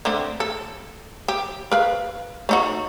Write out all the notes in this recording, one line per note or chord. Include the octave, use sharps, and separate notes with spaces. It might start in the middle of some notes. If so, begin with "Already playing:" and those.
D3 A3 C4
A4
G4
A#4 B4 F5
A3 D#4 F#4